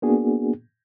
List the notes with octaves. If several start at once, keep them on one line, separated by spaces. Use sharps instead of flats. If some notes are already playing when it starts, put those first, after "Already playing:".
A#3 B3 D4 F#4 G#4